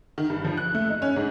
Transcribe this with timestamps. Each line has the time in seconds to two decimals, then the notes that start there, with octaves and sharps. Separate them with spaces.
0.18 D#3
0.30 G2
0.44 F3
0.57 F#6
0.75 A3
0.90 D#4
1.02 C#4
1.16 G#2